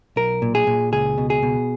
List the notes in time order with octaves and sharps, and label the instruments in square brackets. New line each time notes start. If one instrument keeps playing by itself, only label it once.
[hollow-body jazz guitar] B1 A#4
A#2
G#4
A#2
C#2 G#4
B2
G#4
B2